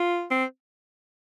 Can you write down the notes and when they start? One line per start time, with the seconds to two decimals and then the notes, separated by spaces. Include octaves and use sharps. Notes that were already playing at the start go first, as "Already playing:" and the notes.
Already playing: F4
0.30 C4